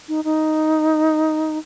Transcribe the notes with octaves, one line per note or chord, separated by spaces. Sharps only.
D#4
D#4